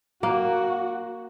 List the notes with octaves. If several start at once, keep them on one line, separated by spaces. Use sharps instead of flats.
A#3 F#4